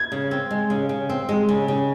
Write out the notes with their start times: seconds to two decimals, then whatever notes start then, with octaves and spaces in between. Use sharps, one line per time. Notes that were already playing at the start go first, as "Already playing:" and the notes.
Already playing: G#6
0.12 C#3
0.31 C4
0.51 G#3
0.70 C#3
0.89 C#3
1.09 C4
1.29 G#3
1.49 C#3
1.68 C#3